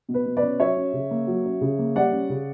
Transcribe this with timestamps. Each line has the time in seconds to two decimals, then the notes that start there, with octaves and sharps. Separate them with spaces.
0.09 B2
0.14 B4
0.26 B2
0.37 B4 D5
0.43 C#4
0.59 F#3 C#5 E5
0.77 C#4
0.93 C#3
1.11 A#3
1.27 F#3
1.45 C#4
1.61 C#3
1.79 A#3
1.96 G3 D5 F#5
2.12 C#4
2.30 C#3